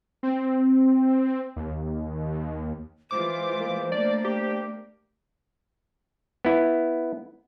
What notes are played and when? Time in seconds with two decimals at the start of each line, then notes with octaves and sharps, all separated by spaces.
0.23 C4
1.56 D#2
3.11 E3 G#3 F4 C5 D6
3.60 A#3
3.92 A3 A#3 D4 D5
4.25 G4
6.45 B3 E4